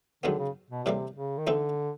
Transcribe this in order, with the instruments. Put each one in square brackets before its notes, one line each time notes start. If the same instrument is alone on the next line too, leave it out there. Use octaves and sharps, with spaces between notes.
[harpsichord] F#2 D#3 G#3 B3 [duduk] D3
[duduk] C#3
B2
[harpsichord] A2 E3 G3 A#3 [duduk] C3
[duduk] C#3
D#3
[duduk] D3 [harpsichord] E3 A3 C4 D#4